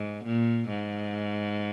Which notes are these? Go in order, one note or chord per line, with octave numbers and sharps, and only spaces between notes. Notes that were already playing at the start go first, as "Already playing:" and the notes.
Already playing: G#2
A#2
G#2